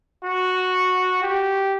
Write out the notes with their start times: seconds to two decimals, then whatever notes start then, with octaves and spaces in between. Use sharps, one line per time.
0.25 F#4
1.23 G4